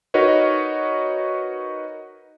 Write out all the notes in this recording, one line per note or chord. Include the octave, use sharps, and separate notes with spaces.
D#4 F#4 A#4 B4 C#5 D#5